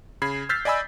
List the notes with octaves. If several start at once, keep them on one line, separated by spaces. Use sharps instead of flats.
C#3 B5 G#6 C7
E6 F6 G6 A6 B6 C7
D5 D#5 G#5 B5 E6